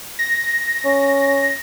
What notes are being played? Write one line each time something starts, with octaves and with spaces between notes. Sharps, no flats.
A#6
C#4